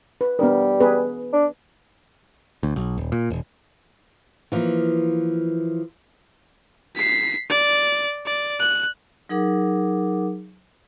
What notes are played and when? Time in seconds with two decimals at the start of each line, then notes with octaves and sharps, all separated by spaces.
0.21 B4
0.39 G3 B3 D4 A#4
0.80 B3 G#4 B4
1.33 D4
2.63 D2
2.76 B1
2.97 D#1
3.12 A#2
3.30 E1
4.52 E3 F3 A#3
6.95 B6 C7
7.50 D5
8.26 D5
8.60 F#6
9.29 F#3 D#4 G#4 A#4 F#5 D6